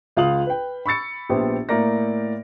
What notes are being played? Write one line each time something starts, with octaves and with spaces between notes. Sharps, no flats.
C#2 F4 F5 D#6 F#7
B4 G5
B5 C#6 E6 A6 C#7
A#1 B3 G4 C5
A2 A#3 A#4 D5 A#6